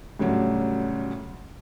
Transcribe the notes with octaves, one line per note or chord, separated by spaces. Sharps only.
D2 A2 C#3 F#3 G3